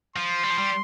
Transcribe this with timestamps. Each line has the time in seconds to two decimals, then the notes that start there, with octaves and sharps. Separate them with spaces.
0.16 F3 C6
0.44 G3
0.51 F3
0.59 G3